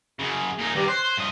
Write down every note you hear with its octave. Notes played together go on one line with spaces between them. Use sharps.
F#2 C#3 G#4
A#2 D#4
G2 D#3 G4 B4 D5
C5 C#5 C6 F#6
G2 D#5